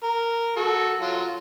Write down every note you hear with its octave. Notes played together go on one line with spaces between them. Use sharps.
A#4
F#4 A4
F#3 F4